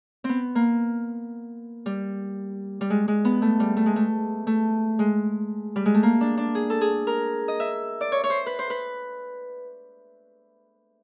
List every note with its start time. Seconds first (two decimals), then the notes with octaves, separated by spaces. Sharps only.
0.24 B3 C4
0.55 A#3
1.86 G3
2.81 G3
2.90 G#3
3.08 G#3
3.25 B3
3.42 A3
3.60 G3
3.77 A3
3.86 G#3
3.96 A3
4.47 A3
4.99 G#3
5.76 G3
5.86 G#3
5.94 A3
6.03 A#3
6.21 D4
6.38 D4
6.55 G#4
6.70 A4
6.81 G#4
7.07 A#4
7.48 D#5
7.60 E5
8.01 D5
8.12 C#5
8.24 C#5
8.30 C5
8.46 B4
8.59 C5
8.70 B4